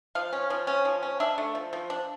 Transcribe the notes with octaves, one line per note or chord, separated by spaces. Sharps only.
F3 F5
C#4
F3
C#4
F3
C#4
D4 E5
A3
F3
F3
D4